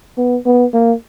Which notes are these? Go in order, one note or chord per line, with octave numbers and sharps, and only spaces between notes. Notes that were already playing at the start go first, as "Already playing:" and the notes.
B3
B3
A#3